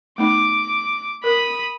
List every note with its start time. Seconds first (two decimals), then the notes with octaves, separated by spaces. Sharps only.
0.18 A3 B3 D#4 D6
1.24 A#4 B5 D#6